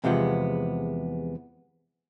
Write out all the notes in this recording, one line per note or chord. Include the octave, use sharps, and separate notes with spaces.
E2 C3 F3 G#3 B3